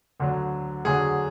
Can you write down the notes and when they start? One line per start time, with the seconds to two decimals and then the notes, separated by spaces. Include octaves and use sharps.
0.20 D2 D3 F#3
0.84 D2 D3 F#3 G#4